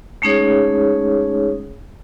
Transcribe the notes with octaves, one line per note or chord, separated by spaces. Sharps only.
G#3 A3 C#4 D#4 G#4 C#5